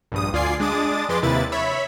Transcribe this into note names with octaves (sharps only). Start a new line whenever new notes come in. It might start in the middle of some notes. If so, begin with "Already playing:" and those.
A#1 G2 D#6
D2 F4 D5 G#5 C7
G#3 D4 D6 D#6 A6
F2 G#3 B4 C6 D6 A6
D#2 C3 A#3 E4 B4 A6
C#5 E5 B5